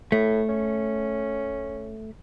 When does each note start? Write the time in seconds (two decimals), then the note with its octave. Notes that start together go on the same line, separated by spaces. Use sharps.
0.12 A2 A3
0.49 C#4